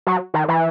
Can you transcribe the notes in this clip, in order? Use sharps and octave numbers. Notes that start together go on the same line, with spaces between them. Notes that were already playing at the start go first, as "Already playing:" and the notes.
F#3
D#3
E3